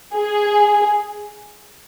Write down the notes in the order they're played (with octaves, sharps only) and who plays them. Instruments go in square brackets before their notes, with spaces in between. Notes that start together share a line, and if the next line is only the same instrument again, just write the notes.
[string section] G#4